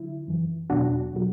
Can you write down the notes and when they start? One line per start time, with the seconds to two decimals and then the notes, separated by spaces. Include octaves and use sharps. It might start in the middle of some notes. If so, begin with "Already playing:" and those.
Already playing: D3 F#3 E4
0.28 F#2 E3
0.70 E2 B2 F#3 D4 F#4
1.14 B2 F#3